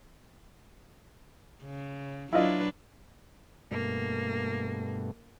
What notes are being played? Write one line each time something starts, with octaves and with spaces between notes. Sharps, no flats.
C#3
F#3 D4 E4 F4 B4 D#5
G2 B2 A3 A#3